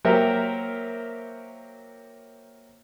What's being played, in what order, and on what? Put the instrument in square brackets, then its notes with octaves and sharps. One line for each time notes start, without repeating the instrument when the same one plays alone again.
[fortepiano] F#3 A#3 G4 A#4 C5 E5